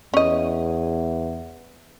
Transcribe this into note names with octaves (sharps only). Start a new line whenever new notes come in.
E2 C#4 D#5